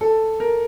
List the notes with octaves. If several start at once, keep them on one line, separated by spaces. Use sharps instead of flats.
A4
A#4